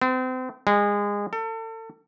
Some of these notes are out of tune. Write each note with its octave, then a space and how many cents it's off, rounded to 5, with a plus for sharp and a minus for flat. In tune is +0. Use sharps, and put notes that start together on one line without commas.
C4 -35
G#3 -25
A4 +35